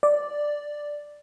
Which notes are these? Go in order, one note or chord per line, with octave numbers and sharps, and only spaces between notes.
D5